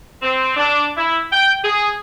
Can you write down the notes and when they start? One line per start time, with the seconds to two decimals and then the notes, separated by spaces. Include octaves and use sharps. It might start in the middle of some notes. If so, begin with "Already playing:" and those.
0.23 C4
0.57 D4
0.97 E4
1.32 G5
1.64 G#4